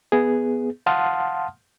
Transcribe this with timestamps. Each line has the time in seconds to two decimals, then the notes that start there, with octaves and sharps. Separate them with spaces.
0.12 B3 G#4
0.86 F5 F#5 A5 C6 D#6 F6